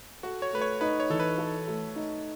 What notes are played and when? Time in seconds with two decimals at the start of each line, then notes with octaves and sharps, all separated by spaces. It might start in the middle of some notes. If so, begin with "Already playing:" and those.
0.23 F#4 A4
0.42 C#5
0.52 A3 B4
0.61 C#5
0.81 D#4 B4
1.00 C#5
1.10 E3 A4
1.20 B4
1.38 A4
1.68 A3
1.96 D#4